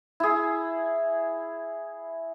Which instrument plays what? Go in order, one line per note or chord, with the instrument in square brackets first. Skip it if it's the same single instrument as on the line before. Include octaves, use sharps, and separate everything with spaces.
[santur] E4 G#4